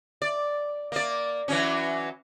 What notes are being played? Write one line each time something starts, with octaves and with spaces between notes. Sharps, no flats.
D5
A#3 D5
E3 F#3 C#4